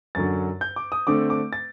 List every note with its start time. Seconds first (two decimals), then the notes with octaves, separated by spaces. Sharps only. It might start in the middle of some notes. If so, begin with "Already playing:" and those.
0.15 F#2 D3 F#3 A6
0.61 G6
0.76 D6
0.92 D#6
1.07 D3 A3 C4 D6
1.30 D6
1.53 A6